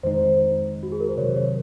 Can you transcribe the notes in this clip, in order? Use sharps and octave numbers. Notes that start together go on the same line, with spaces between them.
F2 D#3 G#3 D#4 C5
F#4
G#4
A#4
C5
C3 D#3 F#3 C#5
C#5